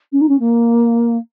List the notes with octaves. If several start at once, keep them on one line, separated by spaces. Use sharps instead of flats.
C#4
D#4
C#4
A#3